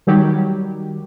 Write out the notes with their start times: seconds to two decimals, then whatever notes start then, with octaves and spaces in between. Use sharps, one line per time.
0.07 D#3 F#3 G3 G4